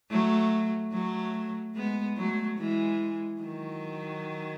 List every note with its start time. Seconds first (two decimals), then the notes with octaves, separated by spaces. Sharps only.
0.10 F#3 A3
0.93 F#3 A3
1.75 G#3 B3
2.17 F#3 A3
2.58 E3 G#3
3.41 D#3 F#3